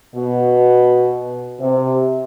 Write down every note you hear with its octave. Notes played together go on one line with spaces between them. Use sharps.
B2
C3